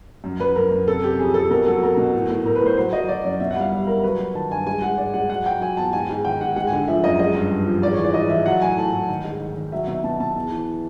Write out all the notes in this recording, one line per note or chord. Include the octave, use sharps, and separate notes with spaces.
F#2
F#2 B4
F#2 A#4
F#2
C3 A4
C3 G4
F2 G#4
F2 A4
B2 A#4
F#3 A4
F#3 A#4
B2
A2
A2
A2 A#4
B4
A2 C5
F#3 C5
F#3 D#5
F#3 D5
F#2 D5
B2 E5
F#5
G3 F5
G3 E5
G3 A#4
F#3 B4
F#3
D#3 A5
G2 G#5
G#3 G#5
G#3 F#5
G#2 D5
G#3 F#5
F#3 F#5
F#3 G5
F#3 G#5
E2 A5
G#2 G#5
G#2
D#3 G5
G#2 F#5
G#3 F#5
G#5
D3
F3 E5
F#2 D#5
G#3 D#5
G2
G2
F3
G#2 D5
C#5
E3
D5
G#2 D#5
E3 E5
F#3 F#5
A2 G#5
A2 A5
A2
D#3
G#2
D#3
D#3
F#3 E5
B2 E5
B2 A5
B2 A5
E2
E3